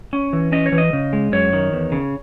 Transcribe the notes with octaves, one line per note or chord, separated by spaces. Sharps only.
C#4
E3
C#4 D#5
C#5
E3
D#5
C#3
G#3
F#2 C#5
D#3
E2
C#3